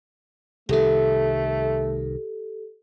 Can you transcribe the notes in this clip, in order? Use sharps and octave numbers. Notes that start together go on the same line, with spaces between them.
C2 D#3 A3 G4 A4